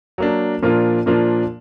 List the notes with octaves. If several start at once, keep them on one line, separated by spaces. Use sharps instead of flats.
F#3 A#3 D4
A#2 F3 A#3 D4 F4
A#2 F3 A#3 D4 F4